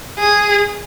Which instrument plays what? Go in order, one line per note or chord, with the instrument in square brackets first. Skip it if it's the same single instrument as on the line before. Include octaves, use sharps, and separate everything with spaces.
[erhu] G#4